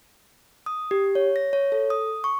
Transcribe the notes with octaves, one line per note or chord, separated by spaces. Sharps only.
D#6
G4
C#5
A#6
C#5
A4
D#6
C#6